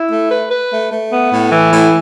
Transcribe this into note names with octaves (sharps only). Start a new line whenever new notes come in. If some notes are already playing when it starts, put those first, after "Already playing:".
Already playing: E4
A3
B4
B4
A3
A3
B3
A2
E3
A2